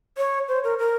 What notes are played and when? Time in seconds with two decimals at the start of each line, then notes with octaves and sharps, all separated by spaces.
0.17 C#5
0.48 C5
0.64 A#4
0.79 A#4